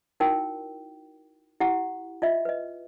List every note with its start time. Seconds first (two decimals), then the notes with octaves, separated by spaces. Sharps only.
0.20 D#4 E4 F#4 A#4 G5
1.60 E4 G4 F#5
2.22 F4 D#5 E5
2.45 B4 D#5